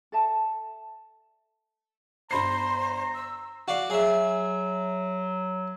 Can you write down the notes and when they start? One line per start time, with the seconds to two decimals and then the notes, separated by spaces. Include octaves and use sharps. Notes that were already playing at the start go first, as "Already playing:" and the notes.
0.12 A4 D5 E5 A5
2.31 G1 C5 A#5 B5 C7
3.15 E6
3.68 F#4 D5 F5
3.90 F#3 G#4 E5